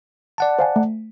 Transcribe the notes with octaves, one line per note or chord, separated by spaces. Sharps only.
D5 F#5 A5
C5 F5 G#5
A3